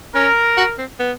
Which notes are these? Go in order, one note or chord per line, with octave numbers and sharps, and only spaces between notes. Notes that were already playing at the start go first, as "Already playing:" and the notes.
C#4 A#4
F#4
C4
B3